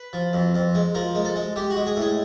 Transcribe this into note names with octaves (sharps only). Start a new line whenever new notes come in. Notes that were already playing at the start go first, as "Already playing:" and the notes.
Already playing: B4
F3
F2
F2
G#3
F3 A#4
G#3
A4
G#3
G#3 G4
F#4
G#3
G#4
A2
G#4